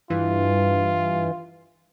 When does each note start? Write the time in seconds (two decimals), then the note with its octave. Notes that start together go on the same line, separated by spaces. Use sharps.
0.10 G2 E3 F4